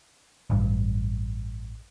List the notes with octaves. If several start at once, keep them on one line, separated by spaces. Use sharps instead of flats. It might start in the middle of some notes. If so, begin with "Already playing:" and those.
A1 G2